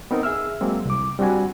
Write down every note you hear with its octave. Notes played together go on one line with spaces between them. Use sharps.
B3 C4 D#4 A#4
G#4 E5 E6 F6
F#3 G#3 A#3 C4
C2 D6
G3 C4 D4 F#4 G#5